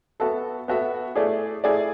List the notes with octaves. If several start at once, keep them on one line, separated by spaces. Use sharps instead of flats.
B3 F#4 A4 E5
B3 F#4 A4 E5
A3 E4 G#4 D5
A3 E4 G#4 D5